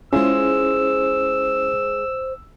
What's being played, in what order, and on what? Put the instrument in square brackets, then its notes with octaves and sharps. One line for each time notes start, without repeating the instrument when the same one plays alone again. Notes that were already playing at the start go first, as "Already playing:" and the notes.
[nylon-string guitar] G#3 F4 G#4 [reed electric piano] C#4 E4 [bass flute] C5 [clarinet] E6